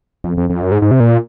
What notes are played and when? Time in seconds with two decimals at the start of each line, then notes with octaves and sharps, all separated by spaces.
0.24 F2
0.37 F2
0.50 F2
0.62 F#2
0.72 G#2
0.82 G#2
0.91 C3
1.00 A#2